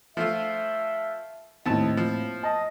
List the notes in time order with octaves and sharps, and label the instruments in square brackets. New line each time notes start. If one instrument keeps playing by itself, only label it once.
[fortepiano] F3 A3 F4 [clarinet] E5
[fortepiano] D#2 A5 [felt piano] A2 C4 [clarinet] D#5
[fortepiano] F3 [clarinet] A#3
[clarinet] D#5 [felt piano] A5